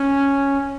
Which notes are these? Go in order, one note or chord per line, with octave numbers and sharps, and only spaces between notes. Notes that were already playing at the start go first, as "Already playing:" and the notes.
Already playing: C#4